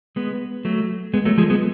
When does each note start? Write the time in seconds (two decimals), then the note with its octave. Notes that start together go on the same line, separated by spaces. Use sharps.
0.16 G#3 B3
0.65 F#3 A3
1.14 G#3 B3
1.25 F#3 A3
1.38 F3 G#3
1.50 G#3 B3